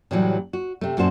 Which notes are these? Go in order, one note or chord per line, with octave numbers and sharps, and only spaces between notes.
A2 C3 E3 F#3 G3
F#4
C3 A3
F#2 A#2 F#4 C5 A5